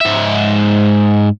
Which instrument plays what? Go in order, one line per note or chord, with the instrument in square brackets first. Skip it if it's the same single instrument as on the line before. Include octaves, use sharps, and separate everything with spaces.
[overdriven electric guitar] G#2 E5